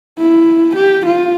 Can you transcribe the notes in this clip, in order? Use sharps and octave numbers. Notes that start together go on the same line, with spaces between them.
E4
G4
F4